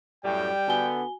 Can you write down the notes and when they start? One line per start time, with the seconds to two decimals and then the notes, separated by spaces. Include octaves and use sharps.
0.25 F#2 A2 G3 G5
0.68 D3 B3 F#4 G#5 G7